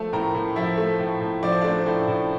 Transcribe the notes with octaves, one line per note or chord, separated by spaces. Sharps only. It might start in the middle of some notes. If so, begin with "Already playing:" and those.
Already playing: F3 A3 A4 A5
A2 A#4 A#5
A2
F3 E4 E5
A3
A2
A2
F3 D5
C5
A3 D4 D5
A2
A2